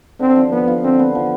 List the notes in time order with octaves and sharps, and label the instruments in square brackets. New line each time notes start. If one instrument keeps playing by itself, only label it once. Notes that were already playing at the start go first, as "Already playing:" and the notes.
[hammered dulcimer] D3 [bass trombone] C4
[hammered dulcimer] F3
[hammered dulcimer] F3 [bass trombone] B3
[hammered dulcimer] F4
[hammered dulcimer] D3 [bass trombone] C4
[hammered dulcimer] B3
F3